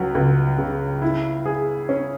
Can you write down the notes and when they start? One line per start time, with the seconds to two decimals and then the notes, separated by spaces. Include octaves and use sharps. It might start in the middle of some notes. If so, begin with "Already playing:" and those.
Already playing: C#2 F#3
0.15 C#2
0.58 C#3
1.02 E4
1.45 G#4
1.89 C#4